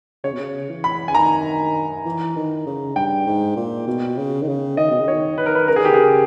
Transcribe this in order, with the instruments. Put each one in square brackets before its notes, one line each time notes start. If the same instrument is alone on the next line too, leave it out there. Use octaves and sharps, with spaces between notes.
[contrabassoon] C#3 [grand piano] C#5
[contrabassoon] B2
C#3
E3
[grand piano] B5
[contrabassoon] C#3 [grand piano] G#5
[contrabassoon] D#3 [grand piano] A#5
[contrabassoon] E3
D#3
C#3
[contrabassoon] G2 [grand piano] G5
[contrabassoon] G#2
A#2
B2
C#3
D#3
C#3
[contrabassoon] D#3 [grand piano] D#5
[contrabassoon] B2
C#3
[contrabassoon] D#3 [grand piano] C#5
[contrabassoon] D#3 [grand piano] B4
[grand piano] A#4
B4
[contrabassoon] C#3 [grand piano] A#4
[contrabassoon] D#3 [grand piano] G#4
[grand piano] G4
[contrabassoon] C#3 [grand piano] G#4